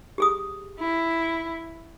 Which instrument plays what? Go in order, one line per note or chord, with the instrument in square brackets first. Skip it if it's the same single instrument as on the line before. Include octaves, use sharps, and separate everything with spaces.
[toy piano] G4 G#4 D#6
[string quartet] E4